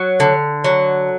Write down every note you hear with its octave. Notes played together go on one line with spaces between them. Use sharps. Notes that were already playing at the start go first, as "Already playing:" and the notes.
Already playing: F#3
D3
F#3